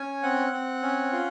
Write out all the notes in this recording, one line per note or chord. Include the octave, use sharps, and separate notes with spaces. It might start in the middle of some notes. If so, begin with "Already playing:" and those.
Already playing: C#4 G#5
C4 F#5
C4
C#4
F4